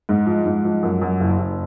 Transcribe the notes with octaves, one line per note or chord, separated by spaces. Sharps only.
G#2
F3
G#2
F3
F#2
F#2
F#1
F#1